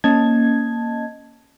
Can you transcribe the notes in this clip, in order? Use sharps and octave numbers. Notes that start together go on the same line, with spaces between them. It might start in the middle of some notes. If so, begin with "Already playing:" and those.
A#3 C#4 D#5 A5 G#6